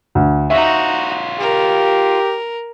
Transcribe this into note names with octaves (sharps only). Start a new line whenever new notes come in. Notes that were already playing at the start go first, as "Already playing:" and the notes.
D2
D#4 F4 F#4 C#5 E5
G4 A#4